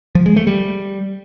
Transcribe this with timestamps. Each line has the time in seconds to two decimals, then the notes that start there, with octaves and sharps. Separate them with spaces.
0.15 F3
0.26 G#3
0.36 A3
0.47 G3